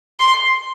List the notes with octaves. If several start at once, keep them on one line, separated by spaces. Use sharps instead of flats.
C6